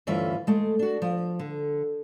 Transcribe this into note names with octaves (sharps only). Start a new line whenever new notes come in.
D2 G2 E3 C#4 F4 E5
G#3 A3
D4 F#4
F3
D3